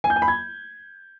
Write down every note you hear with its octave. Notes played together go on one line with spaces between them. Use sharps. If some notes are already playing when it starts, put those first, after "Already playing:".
G#5
G6
G#5
B5
G#6